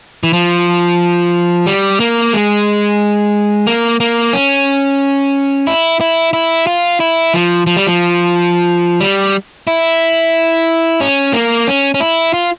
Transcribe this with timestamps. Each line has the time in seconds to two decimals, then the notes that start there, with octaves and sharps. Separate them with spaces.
0.23 E3
0.33 F3
1.66 G3
2.00 A#3
2.33 G#3
3.67 A#3
4.00 A#3
4.33 C#4
5.67 E4
6.01 E4
6.33 E4
6.67 F4
7.00 E4
7.34 F3
7.67 F3
7.77 G3
7.87 F3
9.00 G3
9.67 E4
11.01 C#4
11.33 A#3
11.68 C#4
11.94 C#4
12.00 E4
12.33 F4